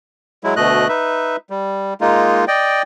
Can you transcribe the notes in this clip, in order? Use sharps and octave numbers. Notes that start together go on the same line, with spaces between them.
F#3 G#3 E4
D2 B2 A3 D#5 F#6
D#4 B4 E5
G3
G#3 A#3 D#4 F4
D5 D#5 G5